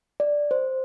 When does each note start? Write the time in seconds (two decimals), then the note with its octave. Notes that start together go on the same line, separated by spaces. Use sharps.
0.20 D5
0.51 C5